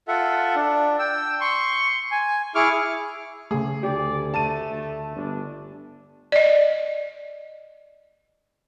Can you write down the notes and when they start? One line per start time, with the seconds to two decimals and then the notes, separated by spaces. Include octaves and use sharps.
0.08 F4 A4 E5 F#5
0.55 D4
0.99 G5 E6
1.41 C6 C#6
2.11 G#5
2.55 E4 G#4 C#6 D6 F6
3.51 C#3 A3 G#4
3.83 D2 G4 D5
4.34 A3 A5 D#7
4.70 D2
5.16 G1 D4
6.32 D5 D#5